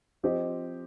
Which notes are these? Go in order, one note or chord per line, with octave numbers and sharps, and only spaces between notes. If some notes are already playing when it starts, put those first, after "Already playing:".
F3 C4 G4 C5 D#5